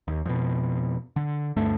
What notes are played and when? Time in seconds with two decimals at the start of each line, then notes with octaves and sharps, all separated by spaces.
0.08 D#2
0.26 F2 B2
1.16 D3
1.56 D2 G2 A3